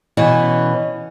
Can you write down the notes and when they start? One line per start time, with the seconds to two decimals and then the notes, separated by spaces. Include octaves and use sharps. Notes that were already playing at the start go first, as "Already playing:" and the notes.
0.17 B2 E3 C#4